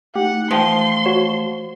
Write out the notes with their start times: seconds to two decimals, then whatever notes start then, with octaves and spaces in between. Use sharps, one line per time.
0.15 A3 D#4 G4 F#5
0.51 E3 F3 A3 F5 G5 C6 D#6
1.05 F#4 C#5 E7